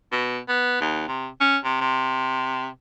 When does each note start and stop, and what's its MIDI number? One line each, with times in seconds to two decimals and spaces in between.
0.12 0.39 47
0.49 0.79 59
0.81 1.06 39
1.08 1.28 48
1.41 1.57 61
1.64 1.80 48
1.81 2.67 48